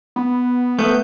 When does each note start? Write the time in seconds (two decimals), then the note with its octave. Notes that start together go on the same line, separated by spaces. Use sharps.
0.16 B3
0.79 A3 B3 G6